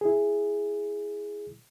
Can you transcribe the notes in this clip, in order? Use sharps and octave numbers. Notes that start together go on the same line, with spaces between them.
E4 G#4